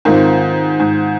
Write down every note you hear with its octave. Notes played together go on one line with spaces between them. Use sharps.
G#2 D#3 C4 F4 A#4
G#2